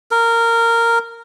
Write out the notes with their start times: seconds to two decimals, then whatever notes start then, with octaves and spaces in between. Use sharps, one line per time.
0.11 A#4